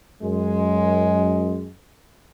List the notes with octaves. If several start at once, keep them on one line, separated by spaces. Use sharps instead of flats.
F#2 G#3